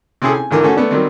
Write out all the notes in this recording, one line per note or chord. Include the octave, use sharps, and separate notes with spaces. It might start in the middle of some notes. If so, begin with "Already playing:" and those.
C3 C4 C#4 E4 G#4 A4
G#5
G#1 D3 E3 A#4
A3 C#4 F#4 A4
A3 B3 D4
D#3 F#3 G3 C4